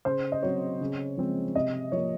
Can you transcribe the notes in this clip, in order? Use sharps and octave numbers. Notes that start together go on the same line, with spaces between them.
C#3 C5
D#5
F#3 C4 C#5
C#3
F3 G#3 C4
C3 D#5
F3 A#3 C#5